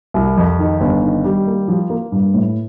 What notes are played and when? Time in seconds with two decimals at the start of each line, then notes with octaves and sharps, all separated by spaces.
0.14 C2
0.37 F2
0.59 D#3
0.81 G1
1.02 D#3
1.24 G3
1.47 A#3
1.68 F3
1.90 A#3
2.12 G2
2.34 A2